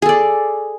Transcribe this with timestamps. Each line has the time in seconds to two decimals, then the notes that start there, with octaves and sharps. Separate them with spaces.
0.02 G#4
0.06 A4
0.09 D5